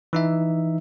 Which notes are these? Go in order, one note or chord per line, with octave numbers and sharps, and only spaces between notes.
E3 D#4 E5